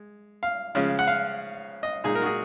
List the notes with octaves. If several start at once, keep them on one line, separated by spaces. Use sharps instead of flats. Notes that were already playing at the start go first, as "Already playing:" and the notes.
Already playing: G#3
F5
C#3 F3 G#3 C#4
F#5
F5
D#5
A#2 G#3 D#4 G#4
A#4
F#4
G#4